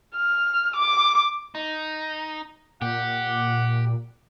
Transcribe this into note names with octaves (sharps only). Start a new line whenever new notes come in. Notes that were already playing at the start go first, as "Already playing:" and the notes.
F6
D6
D#4
A#2 G4 F#5